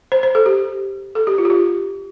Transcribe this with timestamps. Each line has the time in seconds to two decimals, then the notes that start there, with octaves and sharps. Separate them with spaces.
0.12 C5
0.23 C5
0.35 A4
0.46 G4
1.15 A4
1.27 G4
1.38 F4
1.45 G4
1.50 F4